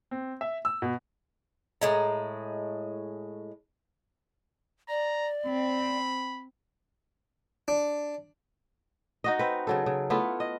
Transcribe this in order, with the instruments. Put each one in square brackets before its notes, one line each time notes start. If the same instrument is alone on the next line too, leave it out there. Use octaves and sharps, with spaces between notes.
[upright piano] C4
E5
E6
B2
[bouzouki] A2 G#3 A#5
[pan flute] D5 [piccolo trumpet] A#5
[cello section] C4 [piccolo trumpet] B5
[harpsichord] D4
[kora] D#4 F#4 D#5
C4 B4
C#3 F#3 A4
C#3
A3 B3 E4 F4
D#5